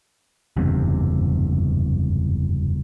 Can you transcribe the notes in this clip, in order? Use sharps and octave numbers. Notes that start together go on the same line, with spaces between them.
F#1 E2 G2 C3